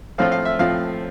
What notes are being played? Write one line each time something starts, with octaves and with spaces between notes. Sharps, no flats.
A2 F3 C4 F4 F5
F5
E5
A2 F3 C4 F4 F5